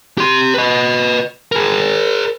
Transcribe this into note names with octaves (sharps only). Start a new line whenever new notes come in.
G4 C6
B4 D#5
G#4 A#4